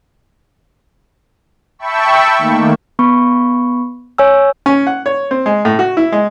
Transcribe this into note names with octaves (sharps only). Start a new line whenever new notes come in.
E5 G5 A5 B5 C#6 E6
D#3 A3 A#3
B3 B5 C#6
C#5 G#5 E6
C#4
F#5
C#5
C4
G#3
A2
F#4
E4
G#3